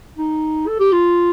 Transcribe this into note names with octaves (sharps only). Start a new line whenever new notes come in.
D#4
A4
G4
F4